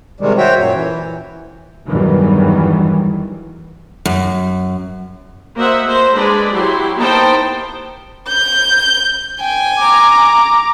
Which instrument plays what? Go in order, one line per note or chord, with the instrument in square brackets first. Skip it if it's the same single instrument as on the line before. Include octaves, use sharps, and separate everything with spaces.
[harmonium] C3 D#3 G3 G#3
F#4 C5 C#5 E5 G5
F#2 A#2 C#5
E3
[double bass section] E2 G2 D#3 E3 F#3 G3
[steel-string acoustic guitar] F#2
[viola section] A#3 F#4 C5 D#5 E5 F#5
A#3 C5 A#5
G#3 D4 B4 D5
F#3 E4 G4 C6
A#3 B3 D#4 C5 G5 A5
[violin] G6
[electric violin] G5 [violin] G#5
[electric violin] A#5 D6